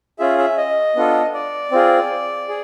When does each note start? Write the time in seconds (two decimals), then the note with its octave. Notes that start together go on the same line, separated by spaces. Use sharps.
0.19 C#4 F4 G#4 E5
0.39 E5
0.57 D#5
0.96 B3 D4 F4 A4
1.34 D5
1.72 C4 F4 G#4
2.49 G#4